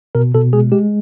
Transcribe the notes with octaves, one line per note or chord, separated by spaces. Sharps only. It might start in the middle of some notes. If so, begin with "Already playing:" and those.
B2 A#4
B2 A4
G#3 G#4
G#3 G4